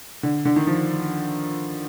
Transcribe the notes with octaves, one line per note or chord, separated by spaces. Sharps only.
D3
D3
D#3
F3